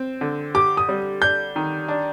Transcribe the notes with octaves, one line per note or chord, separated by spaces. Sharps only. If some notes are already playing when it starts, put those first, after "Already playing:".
Already playing: C4
D3
G4 D6
D#6
G3
D4 G6
D#3
D4